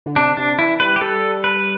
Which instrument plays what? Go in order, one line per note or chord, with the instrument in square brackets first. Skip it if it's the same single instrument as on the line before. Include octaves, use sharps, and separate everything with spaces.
[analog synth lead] D3
[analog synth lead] C3 [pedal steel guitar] D4
[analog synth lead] C3 [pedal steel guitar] D4
[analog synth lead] E3 [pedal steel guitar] E4
[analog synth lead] G3 [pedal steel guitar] B4
[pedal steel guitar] G4
[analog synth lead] G3 [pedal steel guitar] A4
[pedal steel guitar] B4